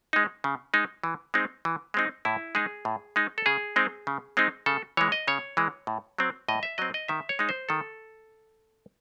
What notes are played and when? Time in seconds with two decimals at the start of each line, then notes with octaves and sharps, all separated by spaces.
0.13 G#3 D#4
0.44 C#3
0.74 G#3 D#4
1.04 E3
1.34 G#3 C4 D#4
1.65 E3
1.94 G#3 C4 D#4
2.25 A2 E4
2.55 G#3 D#4 G#4
2.85 A2
3.16 G#3 D#4
3.38 A4
3.46 C#3 G#4
3.76 G#3 C4 D#4
4.07 C#3
4.37 G#3 C4 D#4
4.66 C#3 A4
4.97 E3 G#3 C#5
5.12 D#5
5.28 C#3 C#5
5.57 E3 G#3
5.87 A2
6.18 F#3 C4
6.48 A2 D#5
6.63 E5
6.78 F#3 C4 D#5
6.94 D#5
7.08 D#3 E5
7.29 C#5
7.39 G#3 D#4
7.49 C5
7.69 D#3 A4